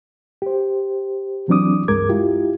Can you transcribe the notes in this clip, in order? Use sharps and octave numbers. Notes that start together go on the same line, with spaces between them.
G4 C5
E3 F#3 C4 D4 D6 D#6
C#2 G2 G#3 A#4 D6 G#6
E4 F4 G4